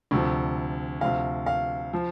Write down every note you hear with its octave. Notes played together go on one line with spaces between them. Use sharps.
D2 C3 F3
D2 C3 F3 F5
F5
F3